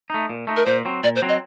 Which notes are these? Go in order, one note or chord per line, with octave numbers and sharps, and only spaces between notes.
A3 D#4
A#2
A3 D#4
A#4
A#2 C5
F#3 C4
A#2 D5
C5
F#3 C4
D#5